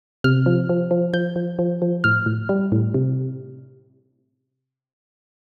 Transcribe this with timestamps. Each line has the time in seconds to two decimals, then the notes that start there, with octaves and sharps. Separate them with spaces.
0.24 C3 F6
0.46 F3
0.69 F3
0.91 F3
1.13 F3 G6
1.36 F3
1.59 F3
1.82 F3
2.04 A2 F6
2.26 A2
2.49 G3
2.72 A2
2.94 C3